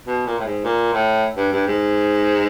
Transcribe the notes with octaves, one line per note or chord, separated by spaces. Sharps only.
B2
A#2
A2
G#2
A#2
A2
G2
G2
G#2